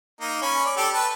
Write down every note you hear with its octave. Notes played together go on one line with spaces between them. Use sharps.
A#3 D#4
C#4 C#5 B5
D5
G4 A4 D5
B4 A5